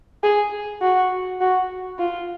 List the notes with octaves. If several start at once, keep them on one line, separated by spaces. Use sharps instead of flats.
G#4
F#4
F#4
F4